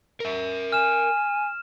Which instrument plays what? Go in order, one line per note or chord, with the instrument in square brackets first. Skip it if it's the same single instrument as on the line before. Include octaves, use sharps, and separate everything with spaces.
[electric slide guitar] A#4 E5
[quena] G#5 [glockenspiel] F6 E7